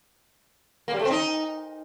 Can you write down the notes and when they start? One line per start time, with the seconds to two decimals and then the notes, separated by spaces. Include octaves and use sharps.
0.88 A#3
0.94 G3
0.99 A3
1.05 C4
1.11 D#4